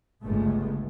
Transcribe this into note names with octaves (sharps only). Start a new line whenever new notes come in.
G1 C#2 G#3 A3